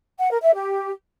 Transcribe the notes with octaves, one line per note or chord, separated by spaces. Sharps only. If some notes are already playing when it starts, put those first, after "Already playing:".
F#5
A#4
E5
G4